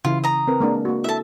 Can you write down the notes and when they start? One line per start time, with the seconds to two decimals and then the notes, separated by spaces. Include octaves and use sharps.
0.05 C#3 E3 E4 F4
0.24 A#5 D#6
0.47 C4 A#4 B4
0.60 G#3 A#3 D4
0.85 A#3 F#4
1.04 E4 A4 E5 A5